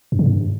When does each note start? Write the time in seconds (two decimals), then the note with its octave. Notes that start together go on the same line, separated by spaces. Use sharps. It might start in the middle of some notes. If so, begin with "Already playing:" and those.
0.12 F#2
0.19 C#3
0.26 G2